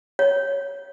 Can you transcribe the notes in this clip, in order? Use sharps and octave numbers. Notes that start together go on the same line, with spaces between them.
C#5